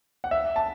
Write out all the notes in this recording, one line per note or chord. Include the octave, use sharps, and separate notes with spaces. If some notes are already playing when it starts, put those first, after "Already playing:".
F#5
E5
A5